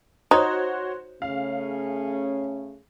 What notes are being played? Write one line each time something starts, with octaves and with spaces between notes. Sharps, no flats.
D#4 F#4 C5 C#5
C#3 A3 C#4 F5